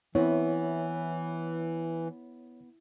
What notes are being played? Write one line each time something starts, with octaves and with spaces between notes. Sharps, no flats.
E3 B3 C4 E4 C#5